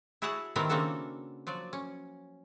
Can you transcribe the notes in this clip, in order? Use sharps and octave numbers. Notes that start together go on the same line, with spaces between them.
E4 F#4 G#4 C#5 F#5 A5
D#3 G3 B3 C4 E4 A#4
C#3 A#3 C4 D4 F#4 A4
F3 F#3 D5
C#4